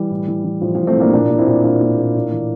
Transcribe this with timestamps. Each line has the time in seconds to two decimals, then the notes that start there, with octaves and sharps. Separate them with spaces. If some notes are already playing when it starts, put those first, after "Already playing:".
Already playing: E3 G3
0.10 A2
0.28 E3
0.45 E3
0.61 A2 F3
0.75 A2 F3
0.87 A3 C4
0.96 A2 A#3 D4
1.13 A#2 A#3 D4
1.30 A#2
1.38 C4 E4
1.47 A#2
1.64 A#2 A#3 D4
1.81 A#2
1.98 A#2
2.15 A2
2.32 E3